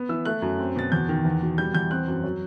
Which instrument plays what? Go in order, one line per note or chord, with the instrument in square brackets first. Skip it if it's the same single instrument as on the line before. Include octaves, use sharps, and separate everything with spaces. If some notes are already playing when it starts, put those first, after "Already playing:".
Already playing: [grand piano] B3
E3 E6
A3 F#6
F#2
C4
B2 A6
E2 G6
D#3
E2
B2
G3 G6
E2 G6
C4 F#6
F#2
F#3